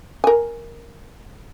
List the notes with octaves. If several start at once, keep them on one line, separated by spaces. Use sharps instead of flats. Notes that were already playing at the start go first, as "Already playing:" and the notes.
A#4 G#5